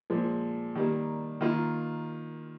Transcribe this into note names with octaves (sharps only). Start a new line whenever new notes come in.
A#2 F3 G#3
D#3 G3 A#3
D#3 A#3 F4